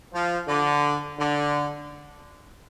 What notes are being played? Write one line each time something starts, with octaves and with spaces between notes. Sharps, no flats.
F3
D3
D3